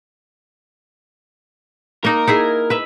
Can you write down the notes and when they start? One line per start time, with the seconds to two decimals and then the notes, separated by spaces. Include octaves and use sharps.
2.05 A#3 D#4 A#4
2.27 D#4 E4 G#4
2.70 B4 E5